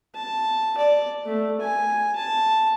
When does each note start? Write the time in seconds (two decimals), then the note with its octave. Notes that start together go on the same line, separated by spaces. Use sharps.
0.15 A5
0.77 D5
1.25 A3
1.61 G#5
2.16 A5